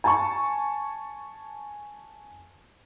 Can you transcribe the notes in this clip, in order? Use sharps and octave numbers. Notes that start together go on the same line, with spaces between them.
G#5 A5 C#6